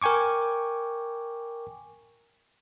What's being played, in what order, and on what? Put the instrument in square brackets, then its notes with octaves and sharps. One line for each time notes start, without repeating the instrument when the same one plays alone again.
[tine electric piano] A#4 G5 G#5 C#6 D6